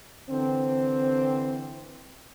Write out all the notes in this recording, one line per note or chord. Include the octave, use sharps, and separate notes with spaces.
D3 E3 C4